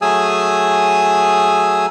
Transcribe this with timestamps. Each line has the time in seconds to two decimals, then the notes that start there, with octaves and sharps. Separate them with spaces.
0.02 F#3 A3 G#4 G#5 D#6 E6